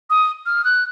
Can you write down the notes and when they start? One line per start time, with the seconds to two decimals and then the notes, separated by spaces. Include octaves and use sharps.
0.10 D#6
0.46 F6
0.64 F#6